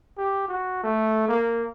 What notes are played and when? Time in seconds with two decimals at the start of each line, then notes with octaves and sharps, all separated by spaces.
0.18 G4
0.48 F#4
0.84 A3
1.28 A#3